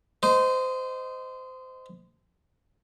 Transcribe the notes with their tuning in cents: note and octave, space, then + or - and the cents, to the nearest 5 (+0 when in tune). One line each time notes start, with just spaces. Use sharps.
C5 -25 D#5 +0 C6 +0